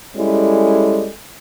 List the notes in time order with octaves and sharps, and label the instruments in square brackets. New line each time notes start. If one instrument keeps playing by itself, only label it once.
[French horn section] G3 G#3 C#4 E4 A4